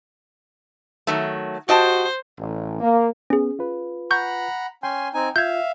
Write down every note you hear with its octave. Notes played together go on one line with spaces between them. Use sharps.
D#3 F#3 A3
F#4 G4 C5 D#5 A5
A1
A#3
B3 C#4 G#4
F4 B4
F#5 A#5 B5 C#6 G6
C#4 G5 G#5 C6
C4 D#4 G#5
F4 E5 F5 G6 G#6